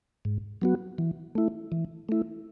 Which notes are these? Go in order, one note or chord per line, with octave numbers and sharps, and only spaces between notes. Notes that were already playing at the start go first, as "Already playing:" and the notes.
G#2
F#3 B3 F#4
E3
A3 E4
E3
A3 E4